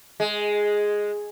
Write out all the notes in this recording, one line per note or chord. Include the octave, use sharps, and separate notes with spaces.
G#3